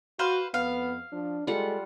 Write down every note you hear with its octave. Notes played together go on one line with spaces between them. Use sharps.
F#4 B4 C5 F5
F2 B3 F5
F3 D4
G3 G#3 F4 A4 F#5